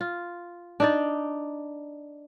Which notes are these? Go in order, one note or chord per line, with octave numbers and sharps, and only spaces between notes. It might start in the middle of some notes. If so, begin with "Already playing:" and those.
F4
D4 D#4 D5